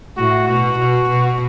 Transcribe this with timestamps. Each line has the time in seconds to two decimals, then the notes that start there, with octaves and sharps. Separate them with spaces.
0.17 A2 F#4
0.47 B2 F#4
0.78 B2
1.09 B2